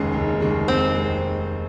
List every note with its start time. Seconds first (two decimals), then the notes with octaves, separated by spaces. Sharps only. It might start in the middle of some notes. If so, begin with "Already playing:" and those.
Already playing: F1 D#2 C#3 G#3 G#4
0.13 F1
0.40 D#2 C#3 G#3
0.68 F1 C4
0.95 G#3